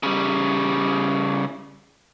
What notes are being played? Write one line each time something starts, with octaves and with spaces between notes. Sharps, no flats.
C#3 G3